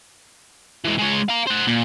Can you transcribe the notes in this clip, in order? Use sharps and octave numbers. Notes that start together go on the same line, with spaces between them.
E3 G#3
G#3 C#5
F5 A#5
C5 F#5
A#2